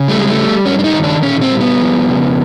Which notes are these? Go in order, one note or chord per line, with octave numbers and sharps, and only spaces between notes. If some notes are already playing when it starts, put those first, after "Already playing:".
Already playing: C#3
G3 A3
G#3
A3
G3
G2 C#4
D4
D#4
D#3
D4
A#2 C#4
C4
G3
B3
F2
C#3